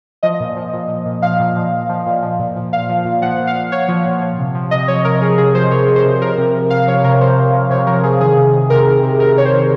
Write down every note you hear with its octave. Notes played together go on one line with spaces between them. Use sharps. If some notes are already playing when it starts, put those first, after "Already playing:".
F3 D#5
A#2
F3
A#2
F3
A#2
F3 F5
A#2
F3
A#2
F3
A#2
F3
A#2
F3
A#2 F5
F3
A#2
F3 F#5
A#2
F5
F3
A#2 C#5
F3
A#2
F3
C3
F3
C3 D#5
F3 C#5
C3 A#4
F3 G#4
C3 G#4
F3 C5
C3 C#5
F3
C5
C3
F3 A#4
C3
F3
C3 F5
F3 C#5
C3 A#4
F3 C5
C3
F3
C3 C#5
F3 A#4
C3 G#4
D#3 G#4
C3
D#3
C3 A#4
D#3
C3
D#3 A#4
C3 C#5
C5
D#3